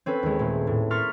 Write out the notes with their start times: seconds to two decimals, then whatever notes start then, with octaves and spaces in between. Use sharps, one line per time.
0.06 C4 C#4 A4 B4
0.23 D#2 G#3
0.39 A#2 A3
0.67 A2
0.90 A#4 C6 C#6 F6 A6 B6